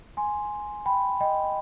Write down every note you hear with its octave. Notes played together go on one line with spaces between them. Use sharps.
G#5 C6
G5 B5
D#5 G5